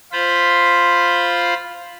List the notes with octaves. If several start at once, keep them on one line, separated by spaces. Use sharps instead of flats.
F4 C5 B5